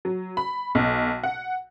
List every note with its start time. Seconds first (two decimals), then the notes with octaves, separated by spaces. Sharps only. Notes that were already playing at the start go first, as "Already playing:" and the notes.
0.05 F#3
0.37 B5
0.75 B1
1.24 F#5